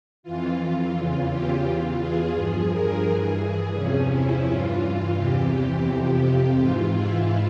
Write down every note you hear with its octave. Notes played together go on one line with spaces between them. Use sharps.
F2 E3 F4
F4
E2 C#3 E3
G4
E2 E3 F4
G#4
G2 F3
A#4
G2 E3 G#4
E2 C3 F3 C#4
E4
G2 E3 F4
E2 C3 E3 G4
F2 C3 F3 G4
G4
G#2 E3 F4
E4